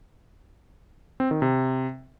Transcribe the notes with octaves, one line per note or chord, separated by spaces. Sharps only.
C4
D#3
C3